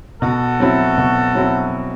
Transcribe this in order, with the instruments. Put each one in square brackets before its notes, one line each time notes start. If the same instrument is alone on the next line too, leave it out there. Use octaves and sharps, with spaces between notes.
[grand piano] B2 [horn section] F#4 A4
[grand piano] F#3 C4 E4
B2
F#3 C4 E4